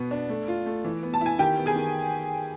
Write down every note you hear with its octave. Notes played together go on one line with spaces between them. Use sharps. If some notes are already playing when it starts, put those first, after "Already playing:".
Already playing: B2 B3
D4
A3
F4
A3
E3
B3
A5
E4 G#5
D#3 G4 G5
B3
G#4 G#5
D#3